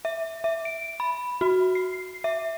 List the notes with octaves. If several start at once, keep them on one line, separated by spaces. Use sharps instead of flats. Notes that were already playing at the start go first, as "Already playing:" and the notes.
E5
E5
D7
B5
F#4
C7
E5